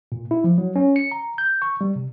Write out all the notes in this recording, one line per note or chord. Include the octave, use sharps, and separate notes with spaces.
A#2
E4
F3
F#3
C#4
C#7
A#5
G6
C#6
G3
C3